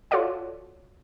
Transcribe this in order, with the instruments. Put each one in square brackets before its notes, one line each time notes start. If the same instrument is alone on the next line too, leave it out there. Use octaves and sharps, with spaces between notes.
[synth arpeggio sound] F4 F#4 A4 C#5 D5 F#5